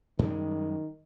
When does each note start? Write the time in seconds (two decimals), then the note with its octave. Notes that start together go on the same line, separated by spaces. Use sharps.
0.19 F#2 D#3 G3 G#3